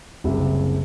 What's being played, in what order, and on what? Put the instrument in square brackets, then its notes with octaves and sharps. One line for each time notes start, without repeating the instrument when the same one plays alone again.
[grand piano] F#1 C2 C3